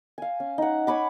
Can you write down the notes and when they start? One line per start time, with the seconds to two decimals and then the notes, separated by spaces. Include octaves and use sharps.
0.18 F5 G#5
0.40 C#4
0.58 D#4 F#5
0.87 C#5 G#5 B5 D6